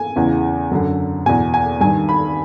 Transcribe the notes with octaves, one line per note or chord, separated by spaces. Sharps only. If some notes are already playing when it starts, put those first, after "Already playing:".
Already playing: G#5
E2 C#3 E3
F#2 D3
E2 B2 G#5
G#5
G2 D#3 G#5
B5